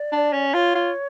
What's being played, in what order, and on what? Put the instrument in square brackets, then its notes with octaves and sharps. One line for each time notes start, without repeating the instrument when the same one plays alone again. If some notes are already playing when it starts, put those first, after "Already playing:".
Already playing: [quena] D5
[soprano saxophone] D4
C#4
[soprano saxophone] F4 [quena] C#5
[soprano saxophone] F4